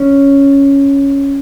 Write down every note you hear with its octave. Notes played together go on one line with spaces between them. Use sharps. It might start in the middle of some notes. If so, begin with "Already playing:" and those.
Already playing: C#4